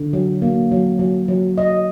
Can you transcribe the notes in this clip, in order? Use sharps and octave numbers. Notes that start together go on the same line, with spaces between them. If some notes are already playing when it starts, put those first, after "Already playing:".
Already playing: D3
F#3
A#3
F#3
F#3
F#3
D#5